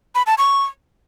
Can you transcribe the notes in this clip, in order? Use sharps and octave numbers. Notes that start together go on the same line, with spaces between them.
B5
A5
C#6